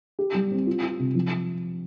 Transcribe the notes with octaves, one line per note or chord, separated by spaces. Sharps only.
G4
G3
C4
F4
F4
C3
F3